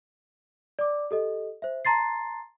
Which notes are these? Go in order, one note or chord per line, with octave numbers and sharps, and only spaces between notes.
D5 D6
G4 A4 D#5
C5 E5
A5 A#5 C6 A6 C7